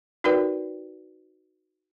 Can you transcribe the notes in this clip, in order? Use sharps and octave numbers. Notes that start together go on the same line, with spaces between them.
D#4 F#4 A#4 B4 D5 G5